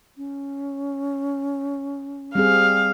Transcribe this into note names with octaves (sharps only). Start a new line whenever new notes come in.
C#4
G3 C4 G#4 F5